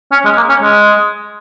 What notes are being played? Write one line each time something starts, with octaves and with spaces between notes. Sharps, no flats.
C#4
G#3
A#3
C#4
G#3